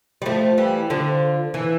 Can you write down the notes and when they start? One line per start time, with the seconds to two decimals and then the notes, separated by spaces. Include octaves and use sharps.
0.22 G3
0.26 F3 A3
0.58 E3 G3
0.90 D3 F3
1.54 E3